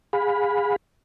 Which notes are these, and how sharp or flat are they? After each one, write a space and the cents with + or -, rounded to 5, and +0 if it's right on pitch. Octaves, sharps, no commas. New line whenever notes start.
G#4 -20 F5 +40 B5 +0